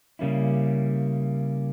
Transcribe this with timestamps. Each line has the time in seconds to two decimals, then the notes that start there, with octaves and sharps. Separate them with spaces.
0.19 C#3 G3 A#3 C#4 E4